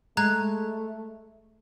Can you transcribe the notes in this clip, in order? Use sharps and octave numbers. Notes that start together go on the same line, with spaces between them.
G#3 A3 A#5 F#6 G#6